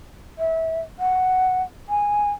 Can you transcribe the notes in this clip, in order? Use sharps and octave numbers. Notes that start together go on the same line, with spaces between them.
E5
F#5
G#5